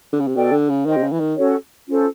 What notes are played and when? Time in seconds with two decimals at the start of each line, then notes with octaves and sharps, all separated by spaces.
0.13 D3
0.20 C#3
0.28 C3
0.35 B2 A4 D5 G5
0.52 D3
0.70 C#3
0.86 D#3 C5 D#5 G5
0.97 C3
1.03 C#3
1.12 E3
1.20 D#3
1.36 C#4 F#4 A4 C#5
1.87 C#4 F4 A4 C5